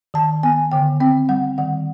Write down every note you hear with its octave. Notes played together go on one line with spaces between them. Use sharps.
D#3 A5
B3 G#5
D3 G5
C4 G5
G3 F#5
D#3 F#5